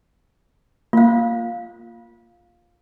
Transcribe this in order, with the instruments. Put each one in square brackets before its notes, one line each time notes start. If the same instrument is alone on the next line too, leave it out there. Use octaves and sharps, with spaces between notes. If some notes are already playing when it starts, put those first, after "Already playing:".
[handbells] A#3 [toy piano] F4 F5